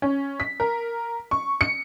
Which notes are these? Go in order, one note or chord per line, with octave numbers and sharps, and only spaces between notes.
C#4
B6
A#4
C#6
C#7